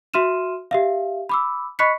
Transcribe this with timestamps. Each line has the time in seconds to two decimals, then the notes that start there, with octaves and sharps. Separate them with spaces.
0.14 F#4 E5 C6 F6 D#7 E7
0.71 G4 E5 F5
1.29 B5 D6 E6
1.79 D#5 B5 C#6 F#6 B6 C#7